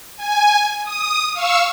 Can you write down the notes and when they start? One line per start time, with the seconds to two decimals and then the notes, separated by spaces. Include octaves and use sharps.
0.16 G#5
0.83 D#6
1.33 F5 C#6 E6